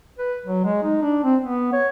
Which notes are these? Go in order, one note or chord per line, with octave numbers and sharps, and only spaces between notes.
B4
F#3
G#3
D#4
D4
C4
B3
C#5